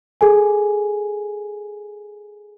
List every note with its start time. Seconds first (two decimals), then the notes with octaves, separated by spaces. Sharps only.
0.21 G#4 A4 G#5